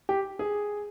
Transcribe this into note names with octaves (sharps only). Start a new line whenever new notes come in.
G4
G#4